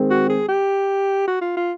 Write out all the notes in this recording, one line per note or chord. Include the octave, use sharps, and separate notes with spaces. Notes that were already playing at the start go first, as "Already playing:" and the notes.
Already playing: D#3 G#3 C4
F#4
G#4
G4
F#4
F4
F4